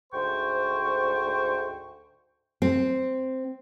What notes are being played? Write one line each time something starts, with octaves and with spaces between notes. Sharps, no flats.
D2 G#2 C5 G5 C#6
C4